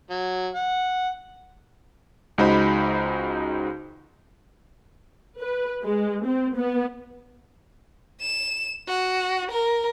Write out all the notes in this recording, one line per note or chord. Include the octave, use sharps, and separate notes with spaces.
F#3
F#5
C#2 G#3 D#4 F#4 C5 B5
B4
G#3
C4
B3
E7
F#4
A#4